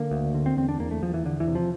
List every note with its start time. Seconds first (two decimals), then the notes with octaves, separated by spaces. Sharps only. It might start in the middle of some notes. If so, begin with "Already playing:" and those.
Already playing: D3 A#3
0.11 D2
0.35 D3
0.46 C4
0.57 E2 C4
0.69 D4
0.79 E2 A#3
0.91 A3
1.02 E2 F3
1.14 E3
1.25 E2 D3
1.40 E3
1.48 C3
1.55 F3